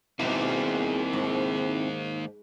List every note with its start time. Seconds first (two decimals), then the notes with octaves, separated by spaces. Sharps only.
0.20 G#2 B2 D#3 A#3 C4 E4
1.13 G#2